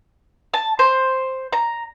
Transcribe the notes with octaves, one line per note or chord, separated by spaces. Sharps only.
A5
C5
A#5